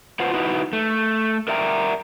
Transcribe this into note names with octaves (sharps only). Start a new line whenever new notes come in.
F4 B4 C5 F#5
D#4 E4 F#4 B4
A3
A#4 D5 E5 G5 A5 A#5